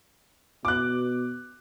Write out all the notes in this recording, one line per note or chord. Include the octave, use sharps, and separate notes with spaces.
B2 D6 F#6